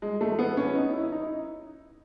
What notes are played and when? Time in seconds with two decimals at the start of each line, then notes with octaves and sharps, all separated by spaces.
0.02 G#3
0.21 A3
0.39 B3
0.57 C#4
0.75 D#4
0.93 E4
1.12 D#4